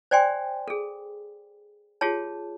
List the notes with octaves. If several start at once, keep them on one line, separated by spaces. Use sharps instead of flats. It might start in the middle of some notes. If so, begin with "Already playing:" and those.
C5 D5 G5 G#5 C6
G#4 A4
F4 G4 G#4 C#5 A5